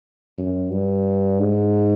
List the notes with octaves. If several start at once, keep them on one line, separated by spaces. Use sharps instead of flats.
F#2
G2
G#2